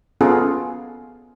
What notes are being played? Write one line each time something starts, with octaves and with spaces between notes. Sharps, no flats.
B3 C#4 F4 G#4 A4